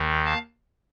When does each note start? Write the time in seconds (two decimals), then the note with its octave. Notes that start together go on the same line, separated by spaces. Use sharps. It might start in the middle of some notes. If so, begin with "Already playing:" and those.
Already playing: D#2 D#3
0.25 F5 A5